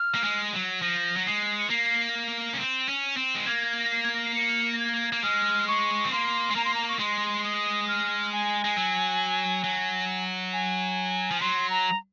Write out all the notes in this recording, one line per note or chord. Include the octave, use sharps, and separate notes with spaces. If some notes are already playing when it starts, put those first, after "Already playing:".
Already playing: F6
A#3
G#3
F#3
F3 A#6
F#3
G#3 C7
C#7
A#3 C7
C#4
C4
C#4
C4
G#3
A#3 G#6
A#6
C7
G#6
A#6
C7
C#7
A#6
G#6
A#3
G#3 F6
C#6
C4
A#3 C6
G#3
A#3 A#5
C6
A#5
C#6
G#3 C6
D#6
F6
G#5
G#3
F#3
F#3
G#5
F3
F#3 C6
A#5